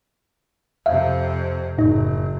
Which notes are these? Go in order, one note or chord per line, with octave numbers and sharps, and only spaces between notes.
F2 C3 E5 F5
F#1 A2 D#4